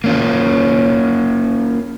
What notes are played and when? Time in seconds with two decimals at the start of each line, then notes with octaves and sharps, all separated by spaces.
0.04 A#3 C#4 F4